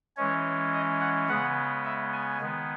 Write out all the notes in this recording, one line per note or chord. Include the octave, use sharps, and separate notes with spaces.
E3 G#3 C#4 C#5
D#5
F#5
C#3 G#3 B3 F#5
E5
G#5
D#3 G#3 B3